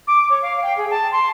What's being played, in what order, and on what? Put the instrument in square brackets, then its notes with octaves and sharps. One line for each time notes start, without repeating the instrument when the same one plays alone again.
[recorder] D6
C#5
F5
G5
G#4
A5
C6